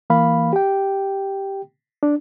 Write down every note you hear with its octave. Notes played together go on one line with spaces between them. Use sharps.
E3 A#3 F5 B5
G4 G5
D4